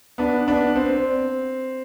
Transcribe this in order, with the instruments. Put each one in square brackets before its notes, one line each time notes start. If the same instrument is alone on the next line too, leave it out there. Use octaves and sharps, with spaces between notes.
[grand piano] B3 D4
B3 D4
C4